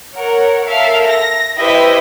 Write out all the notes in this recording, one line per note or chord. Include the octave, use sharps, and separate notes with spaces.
A#4 C#5 F#5
A4 A#4 E5 F5
A#6
E4 G4 B4 C5 D#5 E5